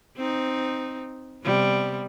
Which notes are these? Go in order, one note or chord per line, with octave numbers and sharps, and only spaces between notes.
C4 D#4
C3 G3 B3